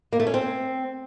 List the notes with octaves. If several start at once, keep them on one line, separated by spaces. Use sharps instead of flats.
A#3
A3
C#4
C4